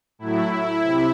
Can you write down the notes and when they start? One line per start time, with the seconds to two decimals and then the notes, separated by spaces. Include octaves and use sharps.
0.19 A2 F#3 A3 E4
0.51 E4
0.83 C3